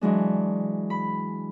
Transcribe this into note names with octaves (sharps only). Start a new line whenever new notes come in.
E3 F#3 G#3 D4
B5